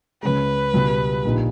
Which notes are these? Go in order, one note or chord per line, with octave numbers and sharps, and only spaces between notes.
C#2 C#3 G#3 B4
C#2 B2 G3 B3 G4
A#1 A#2 A#3 D#4 G4